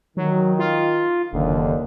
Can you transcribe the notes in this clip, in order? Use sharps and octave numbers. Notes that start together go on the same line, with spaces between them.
D#3 F#3
F4
F#1 D#2 D3